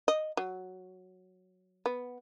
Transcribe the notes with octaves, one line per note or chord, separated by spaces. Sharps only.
D#5
F#3
B3